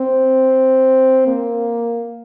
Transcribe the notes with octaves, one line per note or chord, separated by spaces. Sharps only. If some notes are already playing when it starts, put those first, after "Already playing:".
Already playing: C4
A#3